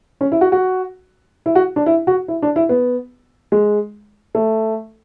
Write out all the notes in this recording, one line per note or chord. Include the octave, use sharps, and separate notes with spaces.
C#4
E4
F#4
F#4
E4
F#4
D4
E4
F#4
E4
D4
E4
B3
G#3
A3